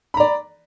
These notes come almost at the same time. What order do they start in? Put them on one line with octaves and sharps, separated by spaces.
B5 A#5 D5